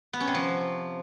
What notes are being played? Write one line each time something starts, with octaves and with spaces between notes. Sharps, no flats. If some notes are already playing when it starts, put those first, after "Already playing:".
B3
C#4
C3
F3